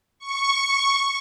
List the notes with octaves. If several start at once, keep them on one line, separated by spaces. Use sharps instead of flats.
C#6